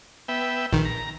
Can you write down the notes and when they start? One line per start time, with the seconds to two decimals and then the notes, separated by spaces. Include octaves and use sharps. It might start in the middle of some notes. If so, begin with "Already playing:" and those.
0.28 B3 E5 G5
0.73 A#1 D#3
0.85 A#5